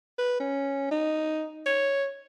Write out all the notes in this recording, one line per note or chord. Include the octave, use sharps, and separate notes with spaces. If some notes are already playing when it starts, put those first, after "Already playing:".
B4
C#4
D#4
C#5